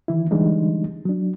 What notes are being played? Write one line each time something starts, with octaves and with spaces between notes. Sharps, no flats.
D#3 E3 E4
D3 E3 G3 G#3 D4 D#4
F#3 D4